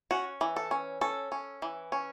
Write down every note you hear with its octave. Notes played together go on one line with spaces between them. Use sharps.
C#4 F#4
E3
A4
C#4
C#4 A4
C#4
E3
C#4